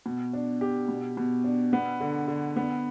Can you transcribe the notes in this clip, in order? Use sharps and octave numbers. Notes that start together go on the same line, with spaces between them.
B2
D4
G4
B2
B2
D4
B3
D3
D3
B3